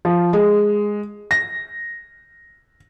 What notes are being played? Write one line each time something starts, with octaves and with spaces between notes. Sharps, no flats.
F3
G#3
A#6